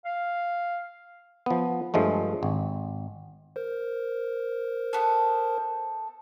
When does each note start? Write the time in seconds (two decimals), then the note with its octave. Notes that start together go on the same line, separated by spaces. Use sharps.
0.05 F5
1.46 F3 B3
1.94 G2 F3 G#3 A3
2.43 G#1
3.56 A#4 C5
4.93 B3 A4